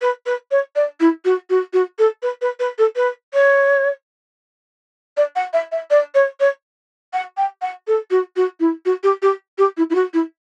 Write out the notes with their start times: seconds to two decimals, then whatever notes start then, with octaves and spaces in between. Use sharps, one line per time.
0.01 B4
0.26 B4
0.51 C#5
0.75 D5
1.00 E4
1.25 F#4
1.50 F#4
1.73 F#4
1.98 A4
2.22 B4
2.41 B4
2.59 B4
2.78 A4
2.96 B4
3.33 C#5
5.17 D5
5.35 F#5
5.53 E5
5.71 E5
5.90 D5
6.14 C#5
6.40 C#5
7.13 F#5
7.37 G5
7.61 F#5
7.87 A4
8.10 F#4
8.36 F#4
8.60 E4
8.85 F#4
9.03 G4
9.22 G4
9.58 G4
9.77 E4
9.90 E4
9.95 F#4
10.13 E4